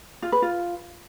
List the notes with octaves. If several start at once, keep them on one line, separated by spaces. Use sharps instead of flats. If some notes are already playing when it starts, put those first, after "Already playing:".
F4
B4
F4